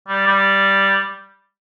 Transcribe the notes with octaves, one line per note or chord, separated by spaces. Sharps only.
G3
G3